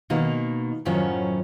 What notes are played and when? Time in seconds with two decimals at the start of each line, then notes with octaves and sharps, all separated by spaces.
0.10 B2 D#3 A#3 D#4
0.85 F#2 A2 D#3 F3 F#3 C#4